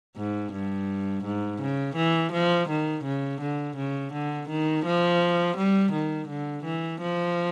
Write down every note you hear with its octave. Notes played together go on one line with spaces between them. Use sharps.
G#2
G2
G#2
C#3
E3
F3
D#3
C#3
D3
C#3
D3
D#3
F3
G3
D#3
D3
E3
F3